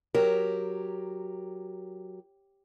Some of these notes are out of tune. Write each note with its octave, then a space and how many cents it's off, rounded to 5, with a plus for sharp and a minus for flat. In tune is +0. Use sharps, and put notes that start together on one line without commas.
F#3 +0 G4 +0 A#4 +0